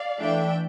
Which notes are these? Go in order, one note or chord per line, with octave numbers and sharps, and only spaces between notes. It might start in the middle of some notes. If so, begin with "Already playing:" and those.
Already playing: D5 F5
E3 A3 D4 E5 G5